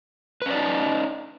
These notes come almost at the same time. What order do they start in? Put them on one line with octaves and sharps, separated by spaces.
B4 C#4 D5 D#4